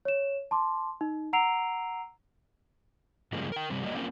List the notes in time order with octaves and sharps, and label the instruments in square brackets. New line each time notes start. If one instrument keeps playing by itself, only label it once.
[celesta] C#5 E7
A5 C6 D6
D#4
F#5 A#5 E6 C7 D7 F7
[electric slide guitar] G2 C#3 F3 G#3 A#3
A#4 G5
G2 C3 G3 C4
F#3 G3 A#3 D#5
A3 A#3 C4 C#4 F4 A#4